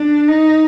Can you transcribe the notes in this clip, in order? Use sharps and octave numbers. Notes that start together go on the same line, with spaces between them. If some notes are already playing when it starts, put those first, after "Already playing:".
Already playing: D4
D#4